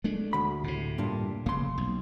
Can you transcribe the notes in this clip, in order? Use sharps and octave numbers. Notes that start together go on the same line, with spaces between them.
G#3 A3 D4
D2 B5
A2 C3
G2 A#2 D4
F1 C#3 A#3 C6
B1